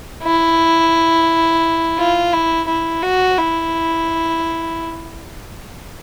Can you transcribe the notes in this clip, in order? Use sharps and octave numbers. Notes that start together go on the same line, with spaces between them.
E4
F4
E4
E4
F#4
E4